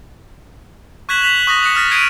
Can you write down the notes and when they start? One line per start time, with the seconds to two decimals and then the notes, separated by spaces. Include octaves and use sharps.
1.09 C#6 F#6 G#6 B6 E7 F#7
1.22 B6 F7 F#7
1.47 C#6 D#6 F#6 A#6
1.63 D#6 A#6 C#7 E7
1.75 D#6 F6 A6 B6
1.91 D#6 G#6 C7 D7 D#7 F7